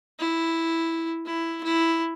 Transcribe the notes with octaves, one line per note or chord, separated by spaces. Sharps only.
E4
E4
E4